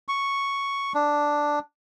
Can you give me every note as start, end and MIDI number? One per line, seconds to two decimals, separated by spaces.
0.08 0.93 85
0.95 1.59 62